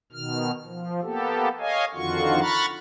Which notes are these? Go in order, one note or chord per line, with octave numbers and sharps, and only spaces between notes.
B2 D#3 F6
F3
A#3 B3 G4 A4
C#5 D#5 F5 G#5
F2 D3 D#3 F4 F#4 C#6
A#5 B5 C#6 F6 F#6 A6